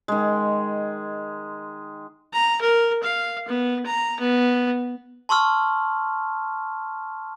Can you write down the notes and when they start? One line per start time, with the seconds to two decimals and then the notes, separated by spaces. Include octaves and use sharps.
0.08 D#3 G#3
2.33 A#5
2.61 A#4
3.03 F5
3.48 B3
3.86 A#5
4.20 B3
5.29 A5 C6 C#6 E6 F6